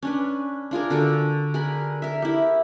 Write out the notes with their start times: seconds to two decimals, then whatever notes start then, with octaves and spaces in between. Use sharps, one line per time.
0.03 C#4 D4 B4
0.71 D4 F4 G#4 A#4
0.90 D3 F#4 A4
1.54 G#4 A#4 B5
2.02 A#4 E5
2.22 E4 G4